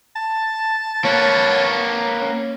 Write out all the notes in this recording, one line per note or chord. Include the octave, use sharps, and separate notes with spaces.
A5
A#3 B4 C#5
C#4